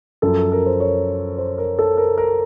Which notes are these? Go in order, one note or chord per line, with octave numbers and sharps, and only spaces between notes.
F#2 F3 A4
A#4
C5
C#5
C5
A#4
A4
A#4
A#4